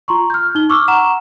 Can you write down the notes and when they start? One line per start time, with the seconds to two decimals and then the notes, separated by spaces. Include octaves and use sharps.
0.08 F4 A#5 C6 C#6
0.30 F6 G6
0.55 D#4 G7
0.70 C#6 D6 E6 F6
0.88 F#5 A#5 C#6 E7